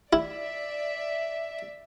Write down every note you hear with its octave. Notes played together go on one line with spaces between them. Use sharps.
E4 D5 E5